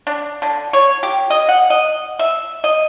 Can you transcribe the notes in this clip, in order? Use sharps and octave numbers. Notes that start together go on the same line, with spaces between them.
D4
D3
C#5
G4
D#5
F#5
D#5
E5
D#5